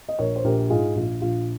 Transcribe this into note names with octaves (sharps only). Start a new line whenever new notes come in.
D#5
A#1 A#4 C#5
C5
A#1 G4 A#4
G#2 F4 G#4
A#1 F4
A#1 F4